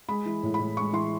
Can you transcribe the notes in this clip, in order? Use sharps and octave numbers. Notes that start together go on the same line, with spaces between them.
G#3 B5
E3
A2
B5
A2
G#3 C#6
E3 C6